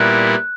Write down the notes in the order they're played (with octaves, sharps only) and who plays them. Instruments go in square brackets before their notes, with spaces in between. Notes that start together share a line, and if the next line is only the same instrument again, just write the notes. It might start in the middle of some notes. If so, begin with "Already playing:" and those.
Already playing: [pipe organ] A#2 G3 B3 E4 A#4 [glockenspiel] F#6